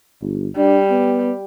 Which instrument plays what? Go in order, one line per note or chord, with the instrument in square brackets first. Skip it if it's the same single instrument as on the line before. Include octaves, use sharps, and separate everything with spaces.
[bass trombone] G1
[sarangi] G3 [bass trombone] D4
[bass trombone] B3